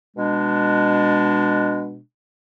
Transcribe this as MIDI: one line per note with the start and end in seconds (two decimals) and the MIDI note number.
0.16 1.99 47
0.16 1.99 56
0.16 1.99 62